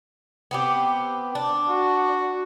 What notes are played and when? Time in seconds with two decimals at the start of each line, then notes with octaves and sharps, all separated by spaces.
0.51 B3 C4 G4
1.35 D4
1.70 F#4